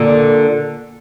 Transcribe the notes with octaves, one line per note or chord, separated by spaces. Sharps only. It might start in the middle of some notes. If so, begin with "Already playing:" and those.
Already playing: A#2 D3